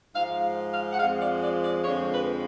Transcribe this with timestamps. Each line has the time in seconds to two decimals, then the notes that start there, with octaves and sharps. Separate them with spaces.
0.15 G#2 F3 G#3 F5
0.71 F5
0.92 F#5
0.99 F2 F3 G#3 F5
1.20 D5
1.42 D5
1.62 D5
1.83 F2 D3 F3 G#3 C#5
2.11 B4